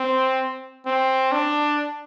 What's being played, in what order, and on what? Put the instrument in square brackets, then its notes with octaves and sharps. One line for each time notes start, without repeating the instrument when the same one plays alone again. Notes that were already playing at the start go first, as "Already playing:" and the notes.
Already playing: [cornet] C4
C4
D4